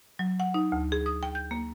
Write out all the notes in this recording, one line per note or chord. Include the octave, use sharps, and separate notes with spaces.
F#3
F#5
D#4
D2
G#4
D#6
G5
G6
A#3